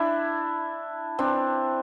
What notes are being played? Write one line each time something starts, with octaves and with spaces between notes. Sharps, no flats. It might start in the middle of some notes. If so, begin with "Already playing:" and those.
Already playing: D4 E4
C4 D4